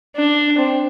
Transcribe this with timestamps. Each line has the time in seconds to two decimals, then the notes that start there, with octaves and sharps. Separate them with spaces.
0.16 D4
0.58 C4